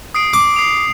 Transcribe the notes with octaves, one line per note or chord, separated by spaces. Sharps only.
D#6 C7 D7
D6
C7 F7